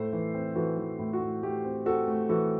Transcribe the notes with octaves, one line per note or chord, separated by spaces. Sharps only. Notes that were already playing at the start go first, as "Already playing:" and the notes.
Already playing: A2 A3 A4 C5
E3
C4
E3 F#4 A4
E3
A2
F#4
A2
A3 G4
C4
C4 F#4 A4
A3
E3 F#4 A4